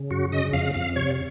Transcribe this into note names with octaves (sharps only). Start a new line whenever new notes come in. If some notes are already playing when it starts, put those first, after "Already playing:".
Already playing: C#3
F#2 F#4
C#3 D#5
F2 F5
F2 F5
C3 C#5